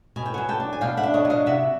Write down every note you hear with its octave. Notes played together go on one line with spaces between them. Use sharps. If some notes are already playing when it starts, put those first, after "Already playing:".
B2 G#5
G5
F#3 F#5 G#5
G5 A5
D4
G#5
B2 F5 G5
E5 F#5
D4
C#5 D#5
F#3
D#5 F5
C3 E5 F#5